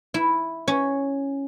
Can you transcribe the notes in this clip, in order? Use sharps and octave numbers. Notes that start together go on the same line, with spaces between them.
E4
C#4